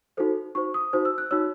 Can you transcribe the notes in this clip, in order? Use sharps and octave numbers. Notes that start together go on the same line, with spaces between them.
D#4 F#4 A4 C5
D#4 F#4 C5 C#6
D#6
D#4 F#4 C5
E6
F#6
D#4 F#4 C#5 E6